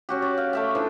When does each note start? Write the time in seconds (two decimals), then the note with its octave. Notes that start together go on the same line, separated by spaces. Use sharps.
0.09 C#4 F#4 G4
0.22 D5
0.38 F5
0.53 A3 E5 G5
0.75 E3 F3 D4